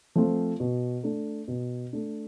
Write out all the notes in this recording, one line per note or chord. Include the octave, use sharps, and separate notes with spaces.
F3 A3 C4 F4
B2
A3 D4
B2
A3 D4